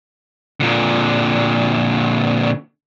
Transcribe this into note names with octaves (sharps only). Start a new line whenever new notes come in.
A#2 D3